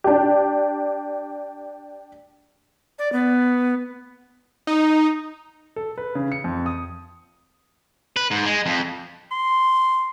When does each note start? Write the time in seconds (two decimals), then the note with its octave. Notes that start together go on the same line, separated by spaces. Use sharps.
0.04 D4 G4
2.99 D5
3.13 B3
4.67 D#4
5.76 A4
5.98 B4
6.15 C#3
6.32 C#7
6.44 F2
6.66 D#6
8.16 B4
8.31 G#2
8.46 G#3
8.66 F2
9.31 C6